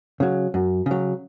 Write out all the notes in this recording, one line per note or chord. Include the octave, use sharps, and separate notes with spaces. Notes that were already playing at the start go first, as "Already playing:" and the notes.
C#3 F#3
F#2
C#3 F#3